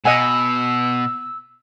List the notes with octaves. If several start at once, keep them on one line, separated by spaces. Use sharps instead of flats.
B2 D#5 F#5 G#5 E6